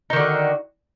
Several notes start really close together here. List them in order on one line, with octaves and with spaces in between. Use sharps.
D#4 D#3 D3 F#4